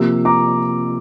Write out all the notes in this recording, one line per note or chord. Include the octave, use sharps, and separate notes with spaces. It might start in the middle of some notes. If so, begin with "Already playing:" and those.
Already playing: C3 F3 A#3 E6
A#5 D6